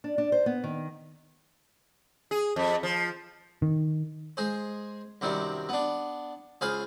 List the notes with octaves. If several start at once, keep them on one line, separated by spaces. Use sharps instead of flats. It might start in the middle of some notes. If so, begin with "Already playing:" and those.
D4
D4
C5
B3
D#3
G#4
F2
F3
D#3
G#3 G#4 C5
F#2 C3 D#3 G3
B3 D4
C#2 G#4 C5 F5 B5